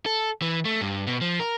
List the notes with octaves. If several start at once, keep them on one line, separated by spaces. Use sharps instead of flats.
A4
E3
A3
G2
B2
F3
A#4